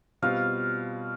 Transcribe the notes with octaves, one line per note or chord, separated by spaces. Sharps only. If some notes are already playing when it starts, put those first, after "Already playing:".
B2 G3 C4 F4 F5